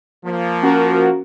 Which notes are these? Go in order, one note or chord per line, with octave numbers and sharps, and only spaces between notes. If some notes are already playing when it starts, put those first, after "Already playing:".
F3 A#3
C#4 F#4 A#4